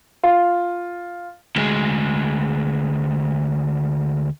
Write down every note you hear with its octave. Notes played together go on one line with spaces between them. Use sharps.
F4
D2 G#3